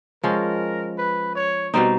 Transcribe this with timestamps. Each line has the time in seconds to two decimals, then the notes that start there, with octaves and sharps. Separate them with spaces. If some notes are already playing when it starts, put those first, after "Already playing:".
0.23 F3 G#3 C#4 A#4
0.98 B4
1.35 C#5
1.74 B2 G3 C4 D#4